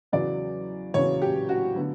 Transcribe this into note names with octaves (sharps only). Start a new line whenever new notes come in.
E2 C#3 F#3 D5
E2 C#3 F#3 C#5
G4
F#4
D3 F#3 B3